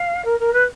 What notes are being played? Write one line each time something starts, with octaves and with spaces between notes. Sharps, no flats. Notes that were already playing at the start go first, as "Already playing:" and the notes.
Already playing: F5
A#4
A#4
B4